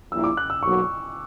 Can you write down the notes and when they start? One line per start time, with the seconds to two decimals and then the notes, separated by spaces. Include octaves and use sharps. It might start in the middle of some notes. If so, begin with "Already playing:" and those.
0.11 A#1 A#2 G3 A#3 E4 E6
0.24 D6
0.37 F#6
0.50 E6
0.62 B1 A#2 F#3 C#6